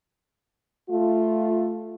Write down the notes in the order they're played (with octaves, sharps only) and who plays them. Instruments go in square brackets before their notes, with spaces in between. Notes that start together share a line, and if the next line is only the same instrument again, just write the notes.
[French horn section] A3 F4